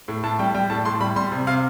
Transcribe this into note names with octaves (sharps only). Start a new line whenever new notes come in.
A2
A2 A5
G3 G5
G3 G5
A2 A5
A2 C6
G3 B5
G3 C6
C3
C3 F5